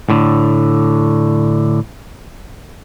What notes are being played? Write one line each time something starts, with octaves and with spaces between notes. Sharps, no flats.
A2 D3